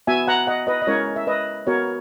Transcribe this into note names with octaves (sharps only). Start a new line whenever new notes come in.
B3 F#4 E5 G#5
F#5 A#5
D#5 F#5
B4 D#5
D#5
G#3 C#4 E4 A#4 C#5
E5
B4 D#5
B3 F#4 A#4 C#5